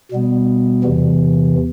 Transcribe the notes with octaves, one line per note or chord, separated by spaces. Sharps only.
B2 G3 B3
E2 C3 E3